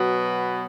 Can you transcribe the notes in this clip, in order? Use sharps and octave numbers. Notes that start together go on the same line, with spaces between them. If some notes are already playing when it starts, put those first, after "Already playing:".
Already playing: B2 F#3 B3